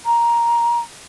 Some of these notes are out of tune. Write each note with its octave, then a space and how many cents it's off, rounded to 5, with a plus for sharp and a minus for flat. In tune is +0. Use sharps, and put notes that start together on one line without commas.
A#5 +10